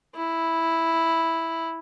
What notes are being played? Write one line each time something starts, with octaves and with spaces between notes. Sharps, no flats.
E4